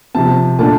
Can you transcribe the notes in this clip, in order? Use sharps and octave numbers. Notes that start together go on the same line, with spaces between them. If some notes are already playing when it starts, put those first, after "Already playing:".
C3 F3 C4 A5
A#2 A3 D4 A5